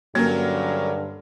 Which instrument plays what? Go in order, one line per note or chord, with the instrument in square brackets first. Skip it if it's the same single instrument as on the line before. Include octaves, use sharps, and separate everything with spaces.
[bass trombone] G2 [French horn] D3 [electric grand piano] F#3 C#4 A#4 [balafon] A#3